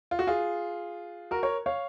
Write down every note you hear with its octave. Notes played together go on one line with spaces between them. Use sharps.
F4
F#4
F4 G#4
F#4 A#4
A#4 C#5
C#5 F5